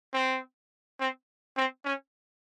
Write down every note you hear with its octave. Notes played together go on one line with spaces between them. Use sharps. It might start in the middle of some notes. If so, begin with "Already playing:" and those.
C4
C4
C4
C#4